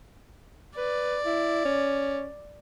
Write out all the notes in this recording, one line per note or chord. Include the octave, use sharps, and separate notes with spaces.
B4 D5
E4
C#4